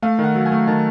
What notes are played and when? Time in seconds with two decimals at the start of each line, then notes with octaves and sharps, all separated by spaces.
0.02 A3 F5
0.19 D#3
0.24 F#5
0.35 F#3
0.46 G#5
0.52 A3
0.67 D#3 A5